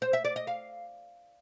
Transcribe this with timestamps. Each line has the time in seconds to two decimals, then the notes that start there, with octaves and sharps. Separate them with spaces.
0.02 C5
0.13 E5
0.25 D5
0.36 D#5
0.47 F5